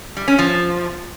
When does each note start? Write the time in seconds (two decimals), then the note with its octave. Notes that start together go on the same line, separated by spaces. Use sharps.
0.17 G3
0.28 C#4
0.39 F3